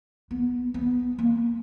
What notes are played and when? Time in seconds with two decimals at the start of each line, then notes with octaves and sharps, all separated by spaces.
0.31 B3
0.74 B3
1.19 A#3